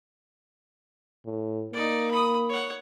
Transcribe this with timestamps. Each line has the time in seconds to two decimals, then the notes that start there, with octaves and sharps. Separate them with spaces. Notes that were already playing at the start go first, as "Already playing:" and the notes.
1.25 A2
1.73 A#3 D#4 D5
2.11 B5 D#6
2.49 C#5 F#5